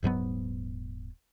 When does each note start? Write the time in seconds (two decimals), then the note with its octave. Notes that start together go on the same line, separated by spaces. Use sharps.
0.03 D#1 G#2 F#3 B3